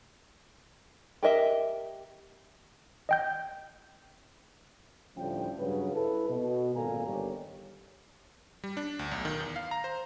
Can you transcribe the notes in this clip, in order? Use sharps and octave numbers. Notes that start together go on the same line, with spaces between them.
G4 A#4 D#5 E5
D#5 G5 G6
D2 A2 F3 G3 C#4 G5
G2 C#3 F#3 B4
E4 A4 B4
B2
G#1 A#2 A#3 A4 G#5 A#5
G1 D#3 G3 G4 C#5
G3
D4
D2
B1
D#3
E2
F5
A#5
C5